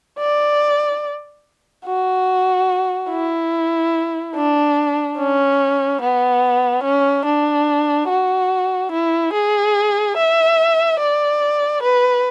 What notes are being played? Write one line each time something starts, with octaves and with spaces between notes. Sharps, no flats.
D5
F#4
E4
D4
C#4
B3
C#4
D4
F#4
E4
G#4
E5
D5
B4